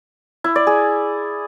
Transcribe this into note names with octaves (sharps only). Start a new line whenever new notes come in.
E4
D5
G#4